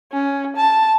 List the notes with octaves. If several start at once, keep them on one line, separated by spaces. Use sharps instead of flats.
C#4
A5